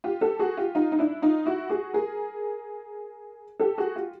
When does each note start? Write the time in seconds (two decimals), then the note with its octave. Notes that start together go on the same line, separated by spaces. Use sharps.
0.04 F4 G4
0.21 G4 A4
0.39 F#4 G#4
0.57 F4 G4
0.75 D#4 F4
0.92 D#4
0.99 D4 E4
1.22 D#4 F4
1.46 E4 F#4
1.69 F#4 G#4
1.93 G#4 A#4
3.60 G4 A4
3.78 F#4 G#4
3.95 F4 G4